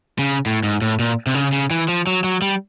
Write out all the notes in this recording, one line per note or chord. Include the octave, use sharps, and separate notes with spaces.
C#3
A2
G#2
A2
A#2
C3
C#3
C#3
E3
F3
F#3
F#3
G3